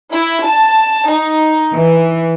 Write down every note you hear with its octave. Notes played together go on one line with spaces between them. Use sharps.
E4
A5
D#4
E3